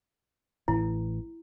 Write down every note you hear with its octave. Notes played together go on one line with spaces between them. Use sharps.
A1 A2 E3 E4